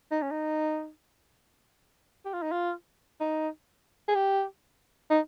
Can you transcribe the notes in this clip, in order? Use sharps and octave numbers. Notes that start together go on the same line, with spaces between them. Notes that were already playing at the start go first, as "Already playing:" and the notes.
D#4
C#4
D#4
G4
F4
D#4
F4
D#4
G#4
G4
D#4